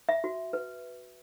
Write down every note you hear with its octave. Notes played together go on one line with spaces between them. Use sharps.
E5
F#4
B4